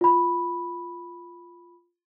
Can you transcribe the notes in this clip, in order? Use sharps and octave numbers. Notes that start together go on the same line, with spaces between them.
F4 B5